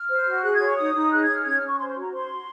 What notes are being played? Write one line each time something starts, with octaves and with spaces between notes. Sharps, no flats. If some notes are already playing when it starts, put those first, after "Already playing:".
Already playing: F6
C5
F#4
G#4 F#6
G#6
C#5 C6
C#6
D#4 D#6
D#4
G#4 F#6
G#6
C#5 D#6
F6
C#4 G#6
F6
C#4
C#6
C5 C6
C6
F#4
A#5
C5 C6
F#4